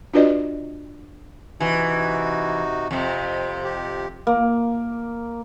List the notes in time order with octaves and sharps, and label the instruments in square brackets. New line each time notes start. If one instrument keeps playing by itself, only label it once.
[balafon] D4 F4 F#4 B4 D5 D#5
[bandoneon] C3 D#4 F#4 [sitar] E3
[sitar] F2 C3
[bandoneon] G4
[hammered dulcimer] A#3